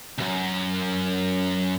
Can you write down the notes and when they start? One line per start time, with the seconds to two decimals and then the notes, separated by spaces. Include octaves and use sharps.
0.18 C#2 F#2